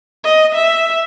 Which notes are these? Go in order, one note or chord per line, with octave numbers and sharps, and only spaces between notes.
D#5
E5